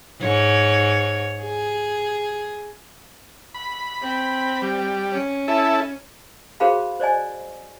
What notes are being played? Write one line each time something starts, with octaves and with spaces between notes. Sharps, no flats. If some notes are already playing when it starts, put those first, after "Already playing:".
G#2 C#5
G#4
B5
C4
G3
C#4
E4 A4
F#4 G#4 A#4 C5 F5 B5
C5 D5 D#5 G#5